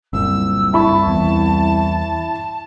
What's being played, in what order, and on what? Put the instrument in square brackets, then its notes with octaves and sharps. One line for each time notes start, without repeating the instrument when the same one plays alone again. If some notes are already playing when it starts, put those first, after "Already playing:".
[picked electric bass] F#1 A#2 [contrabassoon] C2 [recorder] E6
[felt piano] E4 B5 C#6 [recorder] A5
[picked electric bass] E2